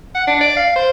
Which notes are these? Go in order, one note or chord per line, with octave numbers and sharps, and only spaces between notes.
F#5
D4
D5
F5
C5